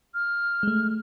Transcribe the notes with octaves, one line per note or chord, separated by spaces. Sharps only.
F6
G#3 A3